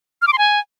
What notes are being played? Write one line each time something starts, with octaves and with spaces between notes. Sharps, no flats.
F6
D6
C6
G#5